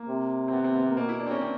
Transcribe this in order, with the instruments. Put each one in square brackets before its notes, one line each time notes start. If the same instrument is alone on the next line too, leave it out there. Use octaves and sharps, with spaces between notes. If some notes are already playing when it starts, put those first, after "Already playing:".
Already playing: [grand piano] A#3
[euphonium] C3
[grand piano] C4
B3
C4
B3
A#3
[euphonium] B2 [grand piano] A#3
[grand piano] E4
D4
C4
C#4
C4